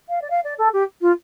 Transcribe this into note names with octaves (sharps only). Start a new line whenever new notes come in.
F5
D5
F5
D5
A4
G4
F4